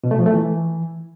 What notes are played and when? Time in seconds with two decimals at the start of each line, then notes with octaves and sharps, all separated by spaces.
0.04 B2
0.11 A3
0.19 F3
0.26 A3
0.34 E3